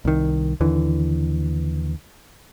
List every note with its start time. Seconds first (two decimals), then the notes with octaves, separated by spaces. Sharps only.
0.05 C2 D#3
0.60 D#2 D3 E3